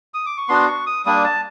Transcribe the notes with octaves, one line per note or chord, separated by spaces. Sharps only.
D#6
D6
C#6
B3 D4 F#4 C6
C#6
D#6
G3 A#3 D4 D#6
A5